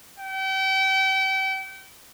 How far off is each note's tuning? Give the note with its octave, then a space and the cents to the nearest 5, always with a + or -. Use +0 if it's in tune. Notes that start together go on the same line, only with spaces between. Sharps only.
G5 -35